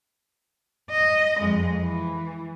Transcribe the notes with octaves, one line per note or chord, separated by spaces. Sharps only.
D#5
F2 G#3
E3